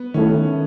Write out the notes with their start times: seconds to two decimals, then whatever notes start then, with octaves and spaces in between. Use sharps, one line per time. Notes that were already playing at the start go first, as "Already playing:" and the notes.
Already playing: B3
0.14 D#3 A3 C#4 E4 A4